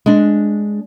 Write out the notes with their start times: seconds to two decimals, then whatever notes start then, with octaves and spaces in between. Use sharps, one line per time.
0.06 G#3 D4